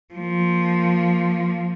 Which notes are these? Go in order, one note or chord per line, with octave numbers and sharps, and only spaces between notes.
F3 A#3